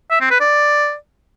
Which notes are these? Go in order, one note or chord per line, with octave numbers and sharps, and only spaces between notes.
E5
C4
B4
D5